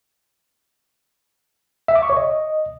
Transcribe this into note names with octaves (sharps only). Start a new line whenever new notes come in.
E5
D6
C#6
C#5
D#5